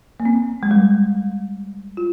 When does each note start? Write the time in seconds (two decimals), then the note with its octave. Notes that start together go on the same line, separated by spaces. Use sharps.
0.20 A#3
0.25 C4
0.63 G#3
0.71 G3
1.97 F4